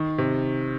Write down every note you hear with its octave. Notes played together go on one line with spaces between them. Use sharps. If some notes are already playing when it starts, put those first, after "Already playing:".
Already playing: D#3
C3